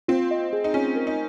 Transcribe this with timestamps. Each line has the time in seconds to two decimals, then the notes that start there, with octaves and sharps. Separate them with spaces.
0.08 C4 F4
0.31 D#5
0.53 G#4
0.64 D#4
0.74 C#4 F4
0.96 A#4
1.07 D#4